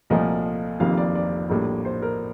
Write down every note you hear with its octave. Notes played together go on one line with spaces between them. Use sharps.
C2 A#2 F3 A3 D#5
F1 F2 C3 D#3 A#3 F5
D5
D5
A#1 A2 G3 A#3
C5
A#4